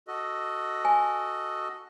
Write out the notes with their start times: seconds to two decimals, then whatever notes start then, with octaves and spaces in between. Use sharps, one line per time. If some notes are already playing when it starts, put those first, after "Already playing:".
0.08 F#4 A4 D#5
0.85 G#5